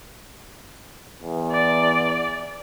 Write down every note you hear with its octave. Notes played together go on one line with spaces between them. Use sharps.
E2
D5